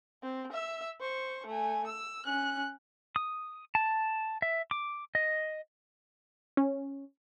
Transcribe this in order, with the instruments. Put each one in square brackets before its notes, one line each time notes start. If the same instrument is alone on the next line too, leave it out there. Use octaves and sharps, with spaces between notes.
[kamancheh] C4
E5 E6
C5 C#6
A3 G#5
E6
C#4 F#6
[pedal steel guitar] D#6
A5
E5
D6
D#5
[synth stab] C#4